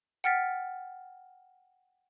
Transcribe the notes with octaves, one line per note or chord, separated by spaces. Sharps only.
F#5 G5 F6 A6 B6